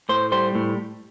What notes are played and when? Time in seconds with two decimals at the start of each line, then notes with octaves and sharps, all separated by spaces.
0.09 A2 C5
0.32 G3 C5
0.55 A2